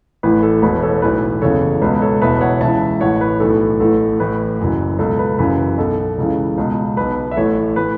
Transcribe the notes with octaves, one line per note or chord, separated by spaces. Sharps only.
A1 A2 E3 B4
A4
E1 E2 B2 B4
A4 C#5
B1 A2 E3 B4
F#1 E2 C#3 E3 A4 C#5
C#2 B2 B4
A4 C#5
E1 E2 B2 B4 E5
C#5 F#5
C#2 C#3 E3 E5 A5
A1 A2 E3 C#5 F#5
B4
B1 A2 E3 A4
A1 A2 E3 A4
A1 A2 E3 B4
F#1 F#2 E3
C#2 B2 A4
B4
F#1 F#2 C#3 E3 B4
B1 B2 A4
C#2 C#3 E3
C#2 B2
B1 B2 B4
E5
A1 A2 E3 A4 C#5
A2 E3 B4